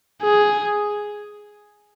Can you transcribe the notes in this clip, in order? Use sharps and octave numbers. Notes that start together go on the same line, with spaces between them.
G#4